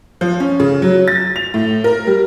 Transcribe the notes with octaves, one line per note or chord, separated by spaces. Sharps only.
F3
C#4
C#3
F#3
A6
F7
A2
A#4
G3